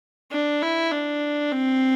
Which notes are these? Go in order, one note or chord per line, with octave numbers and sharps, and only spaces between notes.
D4
E4
D4
C4